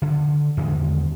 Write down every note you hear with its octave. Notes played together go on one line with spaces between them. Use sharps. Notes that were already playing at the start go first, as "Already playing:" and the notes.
D3
E2 D3 D#3 G#3